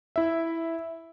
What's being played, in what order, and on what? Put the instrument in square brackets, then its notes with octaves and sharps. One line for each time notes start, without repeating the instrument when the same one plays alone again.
[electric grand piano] E4 E5